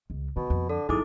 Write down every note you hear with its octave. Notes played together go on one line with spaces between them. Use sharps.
C#2
B2 D3
F2
D3 A4
G1 F#3 D#4 E4 G#4 D6